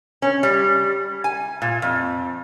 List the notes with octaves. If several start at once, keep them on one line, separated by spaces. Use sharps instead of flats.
C#4
G3
G#5
A#2
F2